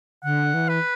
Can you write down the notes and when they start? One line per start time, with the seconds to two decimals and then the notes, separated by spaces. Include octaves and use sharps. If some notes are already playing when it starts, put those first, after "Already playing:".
0.24 D3 F#5
0.54 E3
0.69 B4